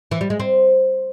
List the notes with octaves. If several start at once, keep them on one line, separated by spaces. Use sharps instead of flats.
E3
G3
G#3
C4